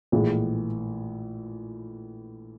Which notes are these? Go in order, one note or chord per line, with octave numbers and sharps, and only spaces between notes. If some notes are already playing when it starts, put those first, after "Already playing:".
A#1 A2 E3 G#3